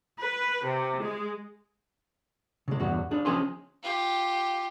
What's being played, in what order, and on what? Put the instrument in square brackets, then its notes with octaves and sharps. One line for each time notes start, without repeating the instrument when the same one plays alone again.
[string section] B4
C3
G#3
[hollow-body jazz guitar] C#3 G#3
E2 G2 F#4
D4 G#4
F3 C#4 G#4 G#5 C6
[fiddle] F4 G4